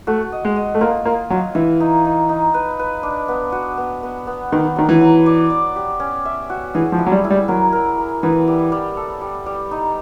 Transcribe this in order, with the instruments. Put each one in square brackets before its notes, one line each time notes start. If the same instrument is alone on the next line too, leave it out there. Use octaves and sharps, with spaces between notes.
[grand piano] A3 [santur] F#4
[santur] D#5
[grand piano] G#3
[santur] D#5
[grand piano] A3
[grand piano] A#3 [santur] F4
[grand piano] A#3 [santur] F4
[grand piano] F#3 [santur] F4
[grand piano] E3 [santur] E5
[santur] D#4
D#4
D#4
B4
B4
D4
B3
F#4
B3
B3
B3
[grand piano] D#3 [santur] B3
[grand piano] D#3 [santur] F#3
[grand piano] E3
[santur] F#3
D5
D5
G4
C#4
E5
F#4
[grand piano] E3 [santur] G#4
[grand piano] F3
[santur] E4
[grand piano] F#3
G3
[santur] E4
[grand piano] G3
[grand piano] F#3 [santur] A#4
[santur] A#4
A#4
[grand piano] E3 [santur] B3
[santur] G3
G3
A4
G3
G3
D#4